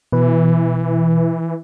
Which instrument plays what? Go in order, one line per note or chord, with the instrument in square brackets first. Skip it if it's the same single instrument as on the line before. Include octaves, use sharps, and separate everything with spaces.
[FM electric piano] B2 B4 [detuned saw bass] E3